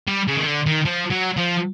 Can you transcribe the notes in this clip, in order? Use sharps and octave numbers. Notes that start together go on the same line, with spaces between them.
G3
C#3
D#3
D3
D#3
F3
F#3
F3